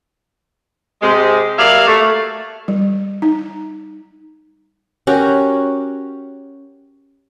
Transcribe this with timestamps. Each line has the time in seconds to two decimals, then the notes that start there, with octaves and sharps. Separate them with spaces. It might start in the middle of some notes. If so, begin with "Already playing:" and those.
1.02 C3 G#3
1.59 F#3 G3 A#3 D5 E5 F5
1.87 A3
2.68 G3
3.22 D#4
5.07 C#4 F#4 G4 A#4